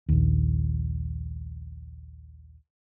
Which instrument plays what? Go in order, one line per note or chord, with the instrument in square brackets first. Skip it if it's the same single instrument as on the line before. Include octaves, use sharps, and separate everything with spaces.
[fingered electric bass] A#1 D#2